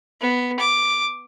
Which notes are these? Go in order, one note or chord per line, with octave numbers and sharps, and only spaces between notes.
B3
D6